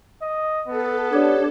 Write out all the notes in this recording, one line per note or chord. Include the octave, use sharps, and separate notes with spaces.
D#5
B3 A4
D4 G4 C#5